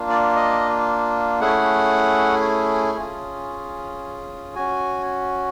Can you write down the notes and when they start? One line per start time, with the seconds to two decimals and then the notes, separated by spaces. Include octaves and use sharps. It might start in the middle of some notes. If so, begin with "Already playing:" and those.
Already playing: A#3 D4 F4
0.10 D5
0.36 D#5
1.41 A3 C#4 E4 G#4 F#5
2.98 C#4 F4 G#4
4.55 C#4 F#4 G#5